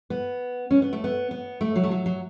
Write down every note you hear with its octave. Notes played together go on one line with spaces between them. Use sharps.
B3
C#4
B3
A3
B3
B3
A3
F#3
A3
F#3
F#3